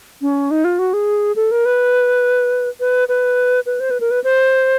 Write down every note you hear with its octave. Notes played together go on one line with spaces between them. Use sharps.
C#4
D#4
F4
F#4
G#4
A4
A#4
B4
B4
B4
B4
C5
B4
A#4
B4
C5